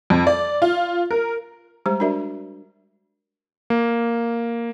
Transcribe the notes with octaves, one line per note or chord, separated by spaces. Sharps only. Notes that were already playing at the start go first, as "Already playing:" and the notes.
F2
D5
F4
A#4
G3 G#3 G4 C5 A#5
D4 F#4 A#4 D5 E5
A#3